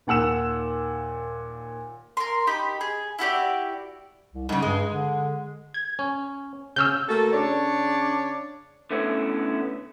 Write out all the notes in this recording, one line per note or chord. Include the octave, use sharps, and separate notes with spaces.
D#2 A#2 F#5 E6 E7
A#4 C6
D#4 G4 B5
G#4
E4 F#4 G4 D5
C2
G#2 C#3 G3
G2 G#3
D3
G#6
C#4
C#3 C#4 E6 F6 G6
A3 A#3 F#4 A4
C#3 D4 C#5 D5
D3 A3 B3 C#4 E4